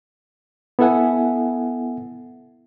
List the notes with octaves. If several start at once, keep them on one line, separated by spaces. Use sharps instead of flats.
B3 E4 A4 E5 F#5 G#5